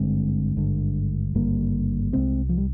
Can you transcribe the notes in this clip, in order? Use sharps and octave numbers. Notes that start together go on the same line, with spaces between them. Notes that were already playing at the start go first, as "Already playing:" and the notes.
Already playing: G#1 G2 D3 G#3 C4
G#1 G2 D3
G#1 G2 D3 G3 A#3
C2 C3 G#3 C4
F3
G3